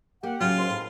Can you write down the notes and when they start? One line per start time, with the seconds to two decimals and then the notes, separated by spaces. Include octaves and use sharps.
0.23 A#3 G4 F#5
0.40 A2 C#3 F#3 F4
0.57 D#2 G#2 C6
0.70 A2